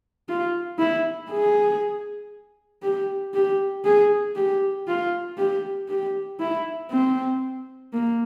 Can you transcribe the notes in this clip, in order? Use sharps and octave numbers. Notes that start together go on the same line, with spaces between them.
F4
E4
G#4
G4
G4
G#4
G4
F4
G4
G4
E4
C4
A#3